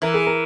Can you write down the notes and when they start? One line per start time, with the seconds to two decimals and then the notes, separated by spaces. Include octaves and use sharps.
0.02 E3 A#4
0.14 G#4
0.27 A#4